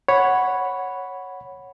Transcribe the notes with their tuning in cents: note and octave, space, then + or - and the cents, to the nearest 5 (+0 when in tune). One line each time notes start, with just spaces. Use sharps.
C#5 +0 F#5 +0 B5 +0